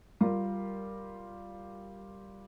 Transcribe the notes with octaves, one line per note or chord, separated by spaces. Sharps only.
G3 F4 A#4